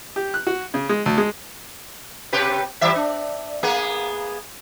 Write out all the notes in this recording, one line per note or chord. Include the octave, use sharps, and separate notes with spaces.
G4
F#6
F#4
C#3
G#3
D2
G#3
C3 G4 B4
E3 G3 E5
D4
A#3 B3 G#4